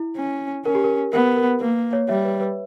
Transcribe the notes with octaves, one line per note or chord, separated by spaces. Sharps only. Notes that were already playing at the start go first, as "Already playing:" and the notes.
Already playing: E4
C#4
C#4 A#4
G4
A#4
B3 A#4
A#4
A#3 B4
C#5
G3 C#5 E5
B4
B4